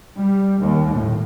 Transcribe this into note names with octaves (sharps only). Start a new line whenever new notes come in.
G3
D#2
A2